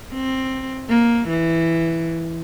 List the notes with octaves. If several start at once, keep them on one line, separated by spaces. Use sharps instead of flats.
C4
A#3
E3